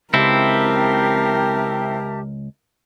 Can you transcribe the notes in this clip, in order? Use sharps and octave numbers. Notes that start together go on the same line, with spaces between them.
C#2 C4 E4 G4 A#4 E5 A5